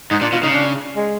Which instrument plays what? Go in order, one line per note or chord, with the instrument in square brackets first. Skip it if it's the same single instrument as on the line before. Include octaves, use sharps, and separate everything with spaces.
[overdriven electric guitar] G#2 [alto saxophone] D#4
[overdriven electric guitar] A#2 [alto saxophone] D4
[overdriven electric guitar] B2 [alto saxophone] F4
[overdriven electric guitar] C#3 [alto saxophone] D#4
[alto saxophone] D4
G#3